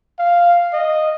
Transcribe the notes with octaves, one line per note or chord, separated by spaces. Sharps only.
F5
D#5